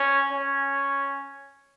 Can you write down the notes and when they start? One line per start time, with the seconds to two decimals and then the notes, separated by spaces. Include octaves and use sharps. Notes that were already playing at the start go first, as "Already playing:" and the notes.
Already playing: C#4
0.31 C#4